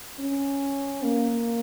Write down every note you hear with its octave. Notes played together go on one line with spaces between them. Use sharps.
C#4
A#3